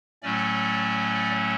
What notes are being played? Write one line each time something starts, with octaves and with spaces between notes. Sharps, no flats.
A2 F#3 A3 C#4 D5